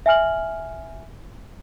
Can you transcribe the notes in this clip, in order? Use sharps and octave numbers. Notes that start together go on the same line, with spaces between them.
E5 G#5 F6 F#7